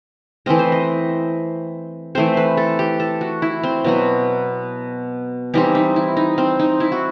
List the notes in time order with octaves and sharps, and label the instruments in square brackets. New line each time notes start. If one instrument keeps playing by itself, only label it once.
[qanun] E3 A3 C4 D#5
C5
D#5
E3 A3 C4 C5
B4
A4
G4
A4
F#4
E4
C4
B2 F#3 B3
E3 G3 C4 D#4
D#4
E4
D#4
C4
D#4
E4
F#4